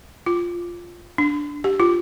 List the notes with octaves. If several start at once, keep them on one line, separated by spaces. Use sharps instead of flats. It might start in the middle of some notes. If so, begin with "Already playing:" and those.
F4
D4
G4
F4